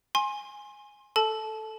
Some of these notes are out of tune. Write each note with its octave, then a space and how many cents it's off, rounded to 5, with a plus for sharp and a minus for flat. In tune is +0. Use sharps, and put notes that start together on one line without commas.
G#5 +0 C6 +30
A4 +0 A5 -20